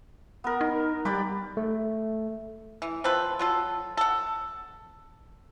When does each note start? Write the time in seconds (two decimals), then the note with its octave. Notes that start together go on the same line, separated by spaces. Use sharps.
0.44 B3 A#4
0.61 D#4
1.05 G3 G4 B4 D5
1.57 A3
2.82 E3
3.04 F3 C4 A4 B4
3.39 F#3 F4 A4
3.97 A4 F#5